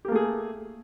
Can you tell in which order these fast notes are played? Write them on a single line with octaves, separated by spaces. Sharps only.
G4 A#3 A3 G#4